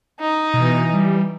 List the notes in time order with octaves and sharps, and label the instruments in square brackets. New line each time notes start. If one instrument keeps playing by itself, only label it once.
[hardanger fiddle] D#4
[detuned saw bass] B2 [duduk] E3
[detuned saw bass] G3